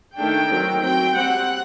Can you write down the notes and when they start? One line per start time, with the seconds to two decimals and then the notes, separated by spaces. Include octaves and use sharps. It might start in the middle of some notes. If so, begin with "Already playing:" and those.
0.17 D#3 A3 D4 G5
0.50 D#3 F#3 C4
0.83 F#3 C4 G5
1.16 G3 C4 F#5